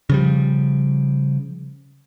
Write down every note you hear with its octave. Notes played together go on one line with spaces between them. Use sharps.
C#3 F3 G3